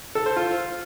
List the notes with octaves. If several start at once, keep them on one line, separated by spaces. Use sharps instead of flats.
A4
C5
F4